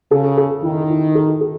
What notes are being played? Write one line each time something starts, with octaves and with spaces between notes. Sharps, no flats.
C#3 A4
A4
D#3 E4
E4
A4
A4